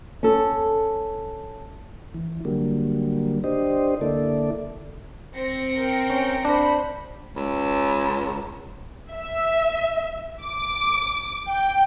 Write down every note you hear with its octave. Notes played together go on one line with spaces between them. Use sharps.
C#4 A4
E3
D3 F#3 G3 A#3
D4 G4 C5 D#5
D3 A#3 E4 A4 D5
C4 A#6 C#7
A#4 G5
C#4
D4 C5 B5
C#2
E5
D6
G5